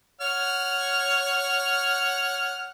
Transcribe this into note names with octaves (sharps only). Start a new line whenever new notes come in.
C#5 F#5 F6